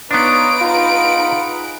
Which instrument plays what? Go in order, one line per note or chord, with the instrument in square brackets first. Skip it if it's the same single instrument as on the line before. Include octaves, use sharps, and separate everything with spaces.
[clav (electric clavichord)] B3 D4 [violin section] D#4 B4 D7 [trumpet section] F4 C#5 D#6
[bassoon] F4 [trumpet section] G#4 F#5 B5